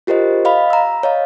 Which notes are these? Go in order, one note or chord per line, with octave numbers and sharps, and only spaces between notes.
F4 G4 A#4 C5 D#5
D#5 F5 B5
A#5 E6
C#5 D#5 F5